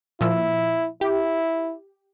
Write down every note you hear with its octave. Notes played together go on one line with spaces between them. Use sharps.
A#2 F3 E4 E6
E4 G4